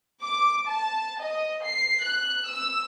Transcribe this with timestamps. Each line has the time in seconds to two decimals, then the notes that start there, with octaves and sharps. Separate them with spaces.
0.22 D6
0.67 A5
1.20 D#5
1.65 C7
2.04 F#6
2.46 E6